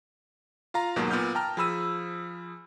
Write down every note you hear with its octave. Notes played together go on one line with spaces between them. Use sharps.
F4 F5 A#5
D#2 G#2 B2 F#3 A#3
A#2 B3 F6 G6
G5 A5 A#5 F6
F3 G#4 B5 E6 D#7